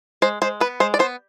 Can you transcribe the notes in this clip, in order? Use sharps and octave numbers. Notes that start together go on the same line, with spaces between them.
G#3 C5
G#3 C5
B3 B4
G#3 C5
D5
B3 C5